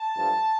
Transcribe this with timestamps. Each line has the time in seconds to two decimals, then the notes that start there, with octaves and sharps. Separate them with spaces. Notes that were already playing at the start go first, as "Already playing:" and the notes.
Already playing: A5
0.15 G2 F3 A3 D4